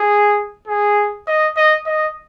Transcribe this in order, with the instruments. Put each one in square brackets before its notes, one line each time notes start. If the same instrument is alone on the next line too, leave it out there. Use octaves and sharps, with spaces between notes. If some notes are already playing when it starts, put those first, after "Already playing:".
Already playing: [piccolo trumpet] G#4
G#4
D#5
D#5
D#5